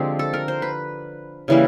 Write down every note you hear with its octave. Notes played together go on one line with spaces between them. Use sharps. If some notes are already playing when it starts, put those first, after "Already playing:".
Already playing: D3 F3 G#3 C4 G4
A4
A#4
C5
B4
C#3 E3 G3 A#3